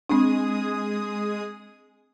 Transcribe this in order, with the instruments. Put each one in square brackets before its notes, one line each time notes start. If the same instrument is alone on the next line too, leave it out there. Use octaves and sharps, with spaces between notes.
[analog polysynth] G#3 G#4 D#6 [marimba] C4 D4